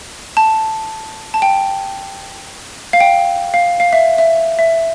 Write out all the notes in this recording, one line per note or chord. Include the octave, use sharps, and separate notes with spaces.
A5
A5
G5
F5
G5
F5
F5
E5
E5
E5